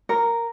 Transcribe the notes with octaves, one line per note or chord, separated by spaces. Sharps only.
A#4